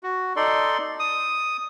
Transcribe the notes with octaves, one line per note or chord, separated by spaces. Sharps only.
F#4
D#4 A4 D5 C6
D#6